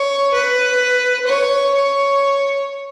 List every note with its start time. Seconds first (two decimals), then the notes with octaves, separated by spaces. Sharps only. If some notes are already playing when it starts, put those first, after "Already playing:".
Already playing: C#5
0.34 B4
1.27 C#5
1.75 C#5